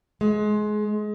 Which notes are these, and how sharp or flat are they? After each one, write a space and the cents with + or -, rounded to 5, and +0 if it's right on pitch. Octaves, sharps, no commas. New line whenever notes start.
G#3 +25